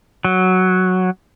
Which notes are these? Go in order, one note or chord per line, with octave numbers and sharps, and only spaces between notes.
F#3